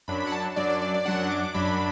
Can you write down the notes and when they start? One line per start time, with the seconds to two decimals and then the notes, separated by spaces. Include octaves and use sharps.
0.08 F#2 F#3 D4 B5
0.20 B5
0.27 F#5
0.32 A5
0.56 F#2 F#3 D4 D5
0.69 D5
0.81 D5
0.94 D5
1.05 F#2 F#3 D4 F#5
1.30 D6
1.44 D6
1.54 F#2 F#3 D4 B5